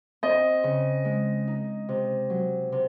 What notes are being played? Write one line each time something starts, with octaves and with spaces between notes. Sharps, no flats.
C4 D#5
C#3
G#3
D#4
C3
F#3
C3